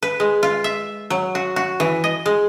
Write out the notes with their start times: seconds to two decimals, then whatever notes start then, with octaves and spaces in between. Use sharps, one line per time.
0.03 B4
0.20 G#3
0.43 F4
0.64 E5
1.10 F#3
1.35 F#4
1.56 F#4
1.80 E3
2.04 D#5
2.26 G#3